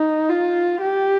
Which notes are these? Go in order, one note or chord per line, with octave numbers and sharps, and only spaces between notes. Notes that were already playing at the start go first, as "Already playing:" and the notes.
Already playing: D#4
F4
G4